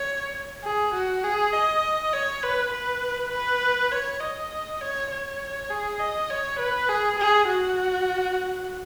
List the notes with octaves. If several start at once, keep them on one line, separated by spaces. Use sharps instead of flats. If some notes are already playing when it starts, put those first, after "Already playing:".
Already playing: C#5
G#4
F#4
G#4
D#5
C#5
B4
B4
B4
C#5
D#5
C#5
C#5
G#4
D#5
C#5
B4
G#4
G#4
F#4